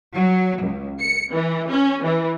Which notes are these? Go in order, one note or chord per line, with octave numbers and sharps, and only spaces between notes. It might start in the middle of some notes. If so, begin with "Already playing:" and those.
F#3
C#2
C#7
E3
C#4
E3